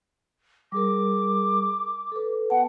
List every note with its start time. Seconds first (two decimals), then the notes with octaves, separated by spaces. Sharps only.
0.72 G3 G#4 A#4 D6
2.12 A4 B4
2.50 B3 F#5 G5 A5